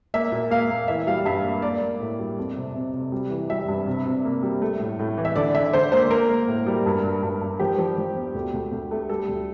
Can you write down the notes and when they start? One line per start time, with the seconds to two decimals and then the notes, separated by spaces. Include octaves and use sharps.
0.14 A#3 E5
0.32 A#2
0.51 A#3 F5
0.70 A#3
0.88 E3 E5
1.07 G3 F5
1.25 G2 E5
1.44 A#3
1.62 A#3 D5
1.82 A#3
2.00 A2
2.19 G3
2.38 F2
2.56 C3
2.74 C3
2.94 C3
3.12 G3
3.30 E3
3.50 G3 E5
3.68 G2
3.86 C3
4.06 C3
4.25 A#3
4.43 G3
4.62 A3
4.80 A2
4.99 A2
5.18 E3
5.25 E5
5.36 D3 D5
5.54 D3 E5
5.73 D3 C5
5.92 A#3 C5
6.11 A#3 A#4
6.29 A#3
6.48 A2
6.66 G3
6.86 G2
7.04 G2
7.23 G2
7.41 G2
7.59 F3 G4
7.78 F3
7.98 F3
8.15 E2
8.35 D2
8.53 D2
8.72 D2
8.91 A3
9.09 G3 A4
9.28 D2